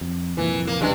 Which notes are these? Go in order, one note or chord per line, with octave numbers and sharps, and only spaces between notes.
F2
C2 F2 A#2 E3
A#3
E1 C2 G2 C#3 G#3